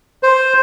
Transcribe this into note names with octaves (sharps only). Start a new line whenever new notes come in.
C5